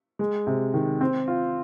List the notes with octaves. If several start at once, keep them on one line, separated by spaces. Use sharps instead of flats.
G#3
C3
D#3
C4
F4